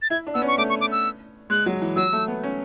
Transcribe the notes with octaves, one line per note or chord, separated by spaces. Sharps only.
A6
E4 G#6
D4
B3 E6
C#4
C#6
A3 D6
C#6
D6
E6
G#3 F#6
F#3
E3
F#3 E6
A3
B3
C#4